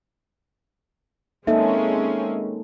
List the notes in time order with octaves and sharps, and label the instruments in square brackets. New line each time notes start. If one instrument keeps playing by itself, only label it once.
[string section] G#3 C4 C#4 [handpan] A#3 D#4 A4 [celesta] E5